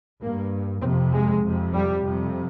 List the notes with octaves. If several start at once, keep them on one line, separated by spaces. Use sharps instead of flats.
G2 A#3
F2 C3 C4
G#3
F2 C3
G3
F2 C3